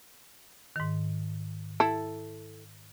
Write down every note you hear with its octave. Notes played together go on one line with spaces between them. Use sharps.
G#2 D#3
E4 A4